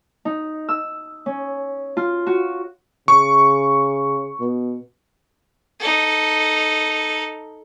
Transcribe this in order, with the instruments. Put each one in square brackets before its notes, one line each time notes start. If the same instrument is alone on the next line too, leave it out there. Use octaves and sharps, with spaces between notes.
[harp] D#4
E6
C#4
F4
F#4
[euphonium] C#3 [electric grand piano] C#6
[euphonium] B2
[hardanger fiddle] D#4 A4